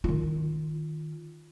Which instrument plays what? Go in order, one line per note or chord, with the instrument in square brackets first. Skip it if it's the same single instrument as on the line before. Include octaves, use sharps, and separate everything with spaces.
[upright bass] D#3 F4